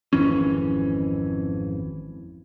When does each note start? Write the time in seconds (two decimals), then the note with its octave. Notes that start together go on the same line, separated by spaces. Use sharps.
0.13 G#1 F2 E3 C#4